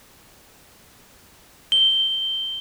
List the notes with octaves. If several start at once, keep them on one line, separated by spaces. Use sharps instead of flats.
G7